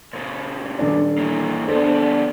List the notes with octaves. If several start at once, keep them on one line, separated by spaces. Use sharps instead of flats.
A#2 C#3
D#1 D4 D5
E3 A#3
D2 B3 D4 A4 C5